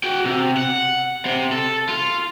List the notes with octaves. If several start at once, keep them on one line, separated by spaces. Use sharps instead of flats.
F#4 G5
C3
F#5
C3
A4
F4